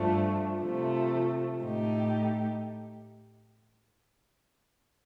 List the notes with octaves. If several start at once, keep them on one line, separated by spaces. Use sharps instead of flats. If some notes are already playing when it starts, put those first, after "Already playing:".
Already playing: G2 F3 A3 D4
C3 F3 A3
A2 A3 D#4 G4